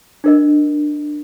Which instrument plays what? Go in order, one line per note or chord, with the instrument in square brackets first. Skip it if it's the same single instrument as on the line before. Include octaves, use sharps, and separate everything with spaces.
[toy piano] D4 A#4 D#5